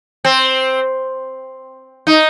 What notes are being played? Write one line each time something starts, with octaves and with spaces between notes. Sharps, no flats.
C4
D#4